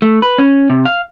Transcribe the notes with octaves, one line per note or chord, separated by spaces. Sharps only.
A3
B4
C#4
C3
F5